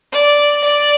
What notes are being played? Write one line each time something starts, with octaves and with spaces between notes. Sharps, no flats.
D5
D5